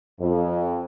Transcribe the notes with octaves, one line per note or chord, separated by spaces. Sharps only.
F2